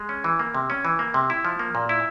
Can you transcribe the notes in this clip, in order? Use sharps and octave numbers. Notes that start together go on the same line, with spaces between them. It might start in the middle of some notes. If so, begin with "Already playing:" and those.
Already playing: G#3
C#4
E3
A#3
C3
C#4
E3
A#3
C3
E4
F3
A#3
A#2
E4